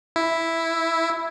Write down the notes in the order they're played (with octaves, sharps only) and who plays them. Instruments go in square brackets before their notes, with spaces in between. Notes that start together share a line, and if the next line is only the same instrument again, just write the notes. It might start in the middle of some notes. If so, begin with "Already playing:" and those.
[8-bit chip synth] E4